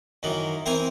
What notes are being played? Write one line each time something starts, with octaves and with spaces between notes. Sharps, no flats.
F#2 D#3 E3
E3 C4 A#4 G5 G#5